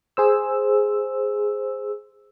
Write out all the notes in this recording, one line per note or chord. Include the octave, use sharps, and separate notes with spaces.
G#4 C5 E6